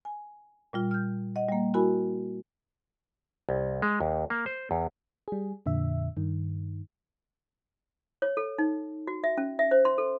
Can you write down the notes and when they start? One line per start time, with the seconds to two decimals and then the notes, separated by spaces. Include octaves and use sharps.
0.05 G#5
0.73 A#2 G3 F4
0.91 F6 G6
1.36 D#5 F#5
1.48 G3 A#3
1.74 E4 F#4 A#4 G#5 B5
3.49 C2
3.82 G#3
4.00 D#2
4.30 A#3
4.46 C5
4.71 E2
5.28 G3 G#4
5.66 F2 A#2 D3 E5
6.17 G2 D#3
8.22 C#5
8.37 A4
8.58 D#4
9.07 F#4
9.24 E5
9.38 C#4
9.59 E5
9.71 C5
9.85 C6
9.98 A4